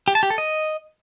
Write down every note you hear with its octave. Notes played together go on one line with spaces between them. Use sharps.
G4
A5
G4
A4
D#5